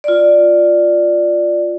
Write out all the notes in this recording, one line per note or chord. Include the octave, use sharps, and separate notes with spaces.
F4 D5